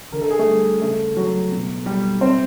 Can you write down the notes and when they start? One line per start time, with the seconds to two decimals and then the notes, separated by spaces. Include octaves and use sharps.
0.12 D3 A#4
0.21 A4
0.31 G#4
0.39 A3 A4
0.47 G3
0.81 C#3 A3 A4
1.17 F#3
1.52 B2
1.86 G3
2.21 C3 C4 C5